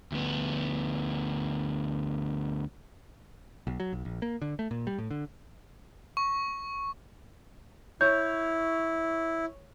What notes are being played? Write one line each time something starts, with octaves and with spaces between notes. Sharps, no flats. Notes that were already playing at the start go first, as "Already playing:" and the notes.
D2 B3
B1
F#3
B1
A#1
A#3
D3
A3
A#2
G3
A2
D3
C#6
E4 C#5 G6